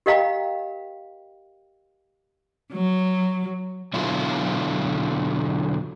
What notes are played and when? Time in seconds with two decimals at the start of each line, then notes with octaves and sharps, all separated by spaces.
0.06 G4 A#4 D#5 F5 G5 A#5
2.73 F#3
3.94 E2 B2 D3 F#3 E4 F4